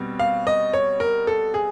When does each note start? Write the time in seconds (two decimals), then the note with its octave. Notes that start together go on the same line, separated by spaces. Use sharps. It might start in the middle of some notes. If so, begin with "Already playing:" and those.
Already playing: B2 G3 C4
0.19 F5
0.47 D#5
0.73 C#5
1.00 A#4
1.27 A4
1.54 G#4